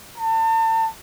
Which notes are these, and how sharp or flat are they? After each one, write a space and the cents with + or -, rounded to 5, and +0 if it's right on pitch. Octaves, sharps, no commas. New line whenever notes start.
A5 +35